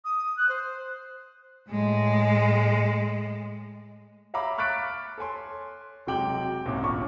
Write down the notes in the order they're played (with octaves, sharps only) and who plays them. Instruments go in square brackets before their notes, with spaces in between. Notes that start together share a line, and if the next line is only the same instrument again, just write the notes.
[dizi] D#6
F#6
C5
[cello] A2 G#3
[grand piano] C#5 E5 F5 A#5 B5 D6
C#6 F6 F#6 A6 B6 D7
A4 C#5 G#5 C6
F1 F#3 G#3 G5 D6 F#7
C2 G#2 A#3 C#4 D6
G1 A#2 D4 C#6 D6